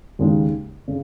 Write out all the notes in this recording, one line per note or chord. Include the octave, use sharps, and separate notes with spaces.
D#2 C#3 G#3 D#4
C#3